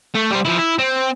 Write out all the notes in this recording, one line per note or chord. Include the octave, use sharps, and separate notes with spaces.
A3
G3 C5
F3 E4
E4
C4